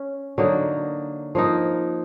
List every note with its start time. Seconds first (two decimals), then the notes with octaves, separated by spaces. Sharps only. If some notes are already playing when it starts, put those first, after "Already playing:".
Already playing: C#4
0.38 D3 F#3 A#3 D#4
1.35 F3 A#3 D#4